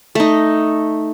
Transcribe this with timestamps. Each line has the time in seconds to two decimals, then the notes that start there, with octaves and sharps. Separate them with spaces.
0.15 A3 D#4